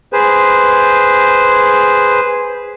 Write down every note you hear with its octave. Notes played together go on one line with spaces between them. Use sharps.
G#4 B4 C5